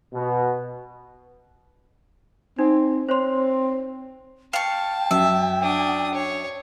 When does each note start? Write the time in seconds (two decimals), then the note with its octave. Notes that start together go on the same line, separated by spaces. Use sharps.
0.14 B2
2.59 C4 D#4
3.09 C4 C5 C#5 C6
4.53 F5 G5 A5 C#6
5.11 F#2 E5
5.62 D4 D#6
6.15 C#5